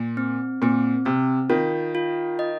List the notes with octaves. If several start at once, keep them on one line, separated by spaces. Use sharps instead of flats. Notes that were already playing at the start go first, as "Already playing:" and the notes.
Already playing: A#2
C4
A#2 C4
C3 C4
D#3 F4
F4
D#5